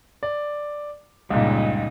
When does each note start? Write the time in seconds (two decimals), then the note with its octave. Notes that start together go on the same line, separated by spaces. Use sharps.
0.23 D5
1.30 C#2 G2 A#2 C#3 D#4